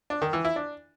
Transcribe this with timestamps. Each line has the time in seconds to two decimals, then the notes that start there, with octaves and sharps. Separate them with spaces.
0.10 D4
0.22 D#3
0.33 E3
0.45 E4
0.56 D4